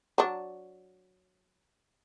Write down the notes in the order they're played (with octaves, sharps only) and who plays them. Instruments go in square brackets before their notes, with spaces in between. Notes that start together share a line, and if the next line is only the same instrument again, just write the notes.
[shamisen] F#3 D4